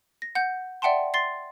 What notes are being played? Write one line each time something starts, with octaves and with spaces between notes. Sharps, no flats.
A#6
F#5 G6
D5 E5 F#5 G5 A5 C6
C6 A6 C7